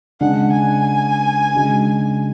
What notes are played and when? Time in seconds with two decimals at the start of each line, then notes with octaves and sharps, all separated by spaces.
0.21 C#3 G#3 D4 F#5
0.53 G#5
1.53 C#3 G#3 D4 F#4